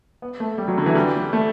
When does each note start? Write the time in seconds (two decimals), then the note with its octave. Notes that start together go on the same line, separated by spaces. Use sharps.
0.22 B3
0.40 A3
0.58 G3
0.68 F#3
0.78 D3
0.86 E3
0.95 G3
1.33 A3